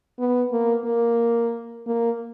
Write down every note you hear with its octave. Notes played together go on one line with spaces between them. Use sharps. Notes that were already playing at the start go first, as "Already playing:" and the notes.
B3
A#3
A#3
A#3